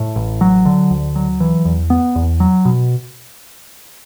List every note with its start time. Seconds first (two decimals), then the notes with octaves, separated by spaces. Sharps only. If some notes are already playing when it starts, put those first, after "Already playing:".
Already playing: A2
0.16 A1
0.41 F#3
0.66 D3
0.91 D2
1.16 F#3
1.40 E3
1.65 E2
1.90 B3
2.16 E2
2.40 F#3
2.65 B2